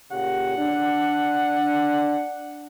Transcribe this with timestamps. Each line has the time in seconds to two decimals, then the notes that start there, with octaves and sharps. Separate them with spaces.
0.11 A#2 C#3 G4 F#5
0.58 D4